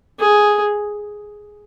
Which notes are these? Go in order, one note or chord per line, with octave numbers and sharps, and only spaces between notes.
G#4